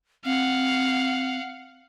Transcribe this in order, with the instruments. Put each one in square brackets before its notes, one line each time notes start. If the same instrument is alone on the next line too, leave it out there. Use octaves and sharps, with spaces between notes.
[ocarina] C4 [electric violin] F5 F#5